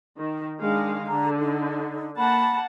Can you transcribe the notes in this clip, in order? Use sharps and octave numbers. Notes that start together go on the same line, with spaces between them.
D#3
D#3 G#3 D4 F5
D3 A#5
D#4
A#3 F#5 A5 B5